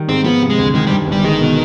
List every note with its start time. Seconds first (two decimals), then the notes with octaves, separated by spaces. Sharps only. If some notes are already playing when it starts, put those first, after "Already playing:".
Already playing: D#3 G3
0.09 G#2 C4
0.24 F3 B3
0.41 C3
0.50 G#3
0.58 D2
0.75 D#3 G#3
0.87 G3
0.91 G2
1.07 G1 G3
1.24 D#3 G#3
1.41 B2